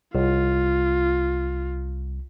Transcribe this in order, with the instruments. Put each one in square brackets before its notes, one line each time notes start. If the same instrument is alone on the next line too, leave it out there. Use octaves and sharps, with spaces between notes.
[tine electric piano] C2 [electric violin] F4